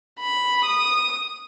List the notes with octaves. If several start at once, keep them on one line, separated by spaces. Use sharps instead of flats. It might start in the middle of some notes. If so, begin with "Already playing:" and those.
B5
D#6